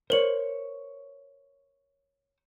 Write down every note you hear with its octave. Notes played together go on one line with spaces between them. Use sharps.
A#4 C5 C#5 F#7